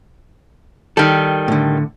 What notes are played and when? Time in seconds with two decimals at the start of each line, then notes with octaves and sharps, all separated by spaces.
0.97 D#3 G3 A4
1.48 A2 D3